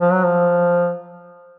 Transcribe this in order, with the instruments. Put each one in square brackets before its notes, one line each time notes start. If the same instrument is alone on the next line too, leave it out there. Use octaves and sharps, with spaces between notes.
[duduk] F3
F#3
F3